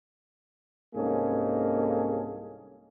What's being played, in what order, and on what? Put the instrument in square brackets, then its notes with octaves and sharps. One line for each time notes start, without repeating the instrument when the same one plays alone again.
[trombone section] C2 G#2 A#3 C#4 G#4 A4